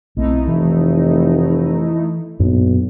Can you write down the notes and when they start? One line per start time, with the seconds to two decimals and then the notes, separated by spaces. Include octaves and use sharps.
0.17 B1 A3 C4 D#4 E4
0.48 F1 E3
2.39 B1 F#2 A#2 D4